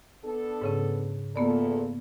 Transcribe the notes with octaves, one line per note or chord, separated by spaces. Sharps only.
B3 D4 A4
G#2 C#3 C#4
E2 A#2 A#3 B3 A4 D5